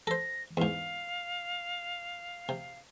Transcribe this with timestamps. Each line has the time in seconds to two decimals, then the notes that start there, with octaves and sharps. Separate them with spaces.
0.07 A4 C5 A#6
0.57 E2 G#2 F5
2.49 C3